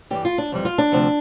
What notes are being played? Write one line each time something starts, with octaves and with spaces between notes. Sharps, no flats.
G2 E3 G3 G4
F4
D4
F2 E3 G3
F4
D4
D2 C3 F3